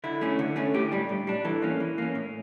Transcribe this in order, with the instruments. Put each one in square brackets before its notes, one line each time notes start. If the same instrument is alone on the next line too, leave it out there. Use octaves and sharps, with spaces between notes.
[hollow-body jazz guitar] D3 E4
A3 C#4
D3
A3 C#4
A2 G4
G3 D4
A2
G3 D4
E3 A4
A#3 C#4
E3
A#3 C#4
A2